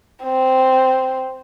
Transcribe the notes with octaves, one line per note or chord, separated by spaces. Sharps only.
C4